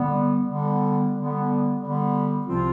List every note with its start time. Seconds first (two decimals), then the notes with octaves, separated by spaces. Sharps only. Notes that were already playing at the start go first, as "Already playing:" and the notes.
Already playing: D3 G3 B3
0.48 D3 G3 B3
1.13 D3 G3 B3
1.79 D3 G3 B3
2.46 C2 C3 F3 C4 F4